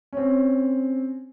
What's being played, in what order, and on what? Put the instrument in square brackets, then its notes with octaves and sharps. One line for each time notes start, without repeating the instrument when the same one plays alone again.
[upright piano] C4 C#4